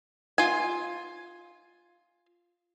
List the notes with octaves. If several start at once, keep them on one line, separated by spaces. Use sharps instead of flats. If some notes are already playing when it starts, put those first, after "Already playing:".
F4 G#5